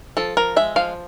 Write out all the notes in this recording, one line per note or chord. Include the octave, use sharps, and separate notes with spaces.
F3 A4
F3 A#4
G#3 E5
F3 F5